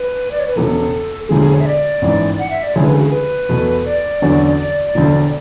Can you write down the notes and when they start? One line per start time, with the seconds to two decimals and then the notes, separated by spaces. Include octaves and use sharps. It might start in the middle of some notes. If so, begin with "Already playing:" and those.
Already playing: B4
0.31 D5
0.40 C#5
0.47 B4
0.55 E1 E2 C#3 A4
1.29 E1 D2 D3 G#3 G#4
1.41 G#4
1.54 C#5
1.60 E5
1.66 D5
2.02 A1 G#2 E3
2.39 F#5
2.51 E5
2.63 D5
2.75 D2 C#3 E3 G#3 C#5
2.85 B4
2.94 A4
2.99 F#4
3.04 G#4
3.12 B4
3.49 E2 B2 A3
3.86 D5
4.22 E2 D3 F#3 C#4 F#4
4.58 D5
4.95 E1 D2 D3